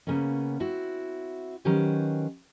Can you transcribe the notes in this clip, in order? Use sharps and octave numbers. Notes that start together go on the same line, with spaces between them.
C#3 A#3 B3 C#4
C4 E4 F#4
D#3 F#3 C#4 G4 B4 C5